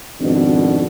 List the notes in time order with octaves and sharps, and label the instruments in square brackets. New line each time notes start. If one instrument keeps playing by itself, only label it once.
[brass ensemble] G#1 F2 B2 D4